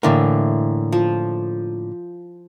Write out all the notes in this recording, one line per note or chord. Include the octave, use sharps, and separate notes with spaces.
A2 D3 E3 A#3
F3